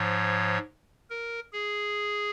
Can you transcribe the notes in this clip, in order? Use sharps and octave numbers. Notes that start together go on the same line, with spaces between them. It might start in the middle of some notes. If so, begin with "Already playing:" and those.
Already playing: G#2 F3 C#5
A#4
G#4